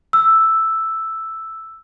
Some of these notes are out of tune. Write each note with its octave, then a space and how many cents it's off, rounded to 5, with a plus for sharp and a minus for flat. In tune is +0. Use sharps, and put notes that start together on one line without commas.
E6 +0